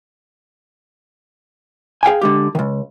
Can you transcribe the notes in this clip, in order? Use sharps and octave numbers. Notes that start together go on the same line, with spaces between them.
G#4 F5 G5 G#5
D3 G#3 G4
C#2 D#3